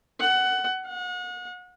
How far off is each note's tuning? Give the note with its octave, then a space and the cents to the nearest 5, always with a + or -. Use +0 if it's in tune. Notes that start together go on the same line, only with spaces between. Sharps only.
F#5 +20
F#5 -35